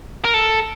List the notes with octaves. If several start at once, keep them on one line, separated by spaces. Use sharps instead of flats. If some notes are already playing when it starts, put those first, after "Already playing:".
A#4
A4